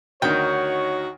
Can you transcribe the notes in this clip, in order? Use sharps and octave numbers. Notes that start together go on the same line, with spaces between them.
D2 D#3 D#4 F#4 C#5 G5